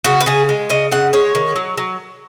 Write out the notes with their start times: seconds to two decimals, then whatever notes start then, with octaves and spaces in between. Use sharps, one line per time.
0.04 C#3 F#4
0.20 B4
0.26 C#3 G#4
0.49 G#3
0.70 C#3 D#5
0.91 C#3 F#5
1.13 G#3 C#5
1.35 D#3
1.56 F#3
1.78 F#3